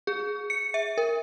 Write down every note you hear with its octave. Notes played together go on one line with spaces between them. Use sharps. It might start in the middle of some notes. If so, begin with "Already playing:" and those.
G#4
C#7
E5
A#4